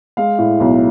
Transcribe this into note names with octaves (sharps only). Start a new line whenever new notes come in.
G#3 F5
A2
B1